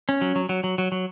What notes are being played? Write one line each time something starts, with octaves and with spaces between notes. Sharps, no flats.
C#4
F#3
F#3
F#3
F#3
F#3
F#3